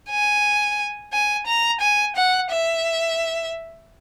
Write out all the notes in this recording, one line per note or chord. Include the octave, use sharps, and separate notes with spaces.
G#5
G#5
A#5
G#5
F#5
E5